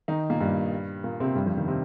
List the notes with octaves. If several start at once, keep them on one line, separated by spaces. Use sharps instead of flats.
D#3 D#4
A#2 A#3
G2 G3
A#2 A#3
C3 C4
G2 G3
F2 F3
D#3
C3 C4